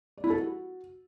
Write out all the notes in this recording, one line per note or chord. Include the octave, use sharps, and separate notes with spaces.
D5
E4
A4
F#4